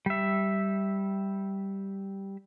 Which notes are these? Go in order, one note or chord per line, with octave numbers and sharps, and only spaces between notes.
G3 E5